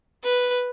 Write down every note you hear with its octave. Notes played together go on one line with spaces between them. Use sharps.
B4